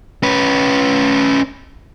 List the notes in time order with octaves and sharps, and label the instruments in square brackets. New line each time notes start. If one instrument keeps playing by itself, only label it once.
[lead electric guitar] C#4 B4